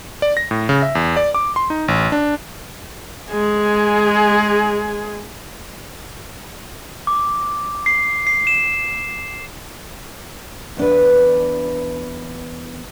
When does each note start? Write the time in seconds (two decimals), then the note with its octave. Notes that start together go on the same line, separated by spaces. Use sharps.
0.22 D5
0.37 A#6
0.51 A2
0.69 C#3
0.82 E5
0.95 E2
1.17 D5
1.35 D6
1.56 C6
1.70 D#4
1.88 A1
2.12 D4
3.31 G#3 G#4
7.07 D6
7.86 C7
8.27 C7
8.47 E7
10.77 E2 D4 B4